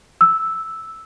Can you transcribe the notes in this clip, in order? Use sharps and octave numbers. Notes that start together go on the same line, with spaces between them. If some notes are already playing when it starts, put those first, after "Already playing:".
E6